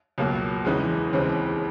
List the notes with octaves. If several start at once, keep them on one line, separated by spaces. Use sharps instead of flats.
C#2 B2 F#3 A#3
E2 C#3 E3 G#3
D#2 C#3 E3 G#3 C4